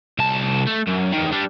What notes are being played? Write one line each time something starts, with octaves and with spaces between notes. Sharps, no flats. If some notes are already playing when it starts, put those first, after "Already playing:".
C2 A5
A3
F#2
E2 D#3
G3 D4